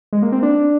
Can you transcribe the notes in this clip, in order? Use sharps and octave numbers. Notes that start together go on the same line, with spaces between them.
G#3
A#3
C4
D4